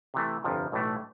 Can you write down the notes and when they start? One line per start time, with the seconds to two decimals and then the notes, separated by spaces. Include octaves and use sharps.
0.14 C3 E3 A3
0.44 G1 F2 C3 F3
0.72 B1 A2 E3 A3